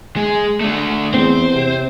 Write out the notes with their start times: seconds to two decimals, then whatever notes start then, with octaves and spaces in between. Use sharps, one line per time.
0.16 G#3
0.61 A3 D4
1.14 E2 C4 C5
1.54 C3